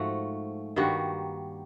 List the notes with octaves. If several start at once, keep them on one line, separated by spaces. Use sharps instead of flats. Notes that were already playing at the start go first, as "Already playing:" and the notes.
Already playing: G#2 F3 A3 F#4
G2 D#3 G3 A#3 F#4